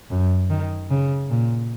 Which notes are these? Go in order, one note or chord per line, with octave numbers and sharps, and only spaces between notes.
F#2
D#3
C#3
A#2